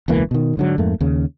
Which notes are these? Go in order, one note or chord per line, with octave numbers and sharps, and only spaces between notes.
E1 C#2 E3 A#3
B2 D#3
G#2 D3 F#3
F2 G#2 A3 A#3
D#2 C#3